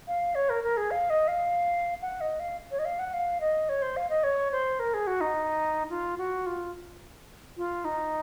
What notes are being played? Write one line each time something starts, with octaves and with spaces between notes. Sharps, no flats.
F5
C#5
A#4
A#4
G#4
F5
D#5
F5
F#5
D#5
F5
C#5
D#5
F5
F#5
F5
D#5
C#5
C5
F5
D#5
C#5
C5
A#4
G#4
F#4
D#4
F4
F#4
F4
F4
D#4